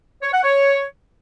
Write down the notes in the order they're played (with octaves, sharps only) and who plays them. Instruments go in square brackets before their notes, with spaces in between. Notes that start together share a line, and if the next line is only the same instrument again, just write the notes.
[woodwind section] C#5
F#5
C#5